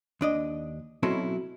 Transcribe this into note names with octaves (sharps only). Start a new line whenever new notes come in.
D#2 D4 D#5
B2 F#3 C4 C#4 E4 A4